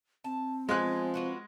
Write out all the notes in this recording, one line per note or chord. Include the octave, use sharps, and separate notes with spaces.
C4 A5
F3 G#3 B3 F5 G#5 F#6
F4 F#4 B4